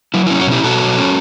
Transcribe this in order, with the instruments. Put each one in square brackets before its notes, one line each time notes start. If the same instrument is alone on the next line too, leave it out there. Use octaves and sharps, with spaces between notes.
[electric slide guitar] F#3 E4
C#4 E4
F#4
B2 E4 G4
B2 F#4 A4
F#3
C#4